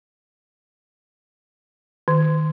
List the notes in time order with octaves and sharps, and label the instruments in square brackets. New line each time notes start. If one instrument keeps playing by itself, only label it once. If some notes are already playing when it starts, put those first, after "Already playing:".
[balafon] D#3